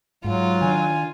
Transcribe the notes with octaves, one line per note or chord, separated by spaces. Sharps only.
G#2 F#3 F4
D#3 D4 G#5